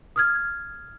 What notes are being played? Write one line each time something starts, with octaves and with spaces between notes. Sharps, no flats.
D#6 F6 G#6